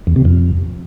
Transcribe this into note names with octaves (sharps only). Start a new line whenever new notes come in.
E2
C3
F2